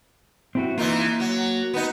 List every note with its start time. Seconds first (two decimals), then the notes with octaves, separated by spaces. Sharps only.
0.55 C4 E4 F#4
0.78 E3 A#3 D#4 F4
1.20 F#3
1.74 B3 D#4